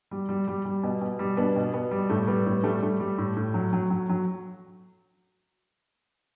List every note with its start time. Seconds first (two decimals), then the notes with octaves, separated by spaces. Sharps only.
0.11 G3
0.29 G3
0.48 G3
0.65 G3
0.83 B2
1.01 B2
1.19 G3
1.37 B2 B3 D4
1.56 B2
1.73 B2 B3
1.91 G3
2.09 A2 A3
2.27 G3 B3
2.46 A2 B3
2.63 G3 A3
2.82 G3 A3
3.00 G3
3.18 A2
3.36 A2
3.54 F#3
3.73 F#3
3.90 F#3
4.09 F#3